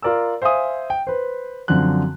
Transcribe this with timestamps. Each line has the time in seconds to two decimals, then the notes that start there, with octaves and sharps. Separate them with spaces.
0.02 F4 A#4 D5 A#5 E6
0.42 C5 E5 F5 G#5 D#6
0.90 G5
1.07 B4 C5
1.68 F#2 D3 F3 C4 F#6